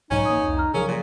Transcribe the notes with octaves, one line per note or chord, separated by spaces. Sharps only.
B1 G#2 F#3 C#4 D#4
A1 A#3 D#6
C2 F2
A#5 F6
C#3 F3 F#3 C#4 G#4 A#4
A#2 G#4